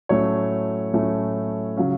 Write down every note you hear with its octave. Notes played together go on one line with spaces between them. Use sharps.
A2 F#3 A3 C#4 C#5
A2 F#3 A3 C#4
C#3 F#3 C#4 F5